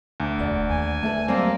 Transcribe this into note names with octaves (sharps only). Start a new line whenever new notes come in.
D2
E1 D5 F#5
D#2 G#5
A3 B4 E5 A5
F#3 G3 A#3 C4